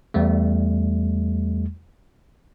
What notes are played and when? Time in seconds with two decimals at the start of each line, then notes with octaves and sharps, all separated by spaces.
0.14 E2 G3 A3